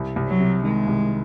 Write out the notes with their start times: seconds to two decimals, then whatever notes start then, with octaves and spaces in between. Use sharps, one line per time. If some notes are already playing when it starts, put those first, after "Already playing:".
Already playing: C2
0.16 C2
0.28 F#3
0.40 C3
0.63 D#3 G#3
0.87 C2